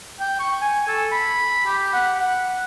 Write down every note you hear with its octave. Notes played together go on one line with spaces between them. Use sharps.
G5
C#6
G#5
A4
B5
G4
F#5
F#5